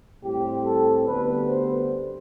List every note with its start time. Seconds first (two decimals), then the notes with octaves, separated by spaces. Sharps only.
0.24 A2 G3 C4 G4
0.65 A4
1.06 D2 D3 G3 B3 B4
1.48 C5